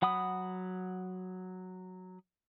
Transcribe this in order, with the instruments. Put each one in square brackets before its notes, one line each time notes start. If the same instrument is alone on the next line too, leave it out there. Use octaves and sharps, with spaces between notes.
[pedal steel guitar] F#3 F#5 B5 D#6